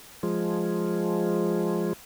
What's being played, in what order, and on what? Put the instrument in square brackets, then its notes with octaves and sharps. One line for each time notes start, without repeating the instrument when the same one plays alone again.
[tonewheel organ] F3 G#3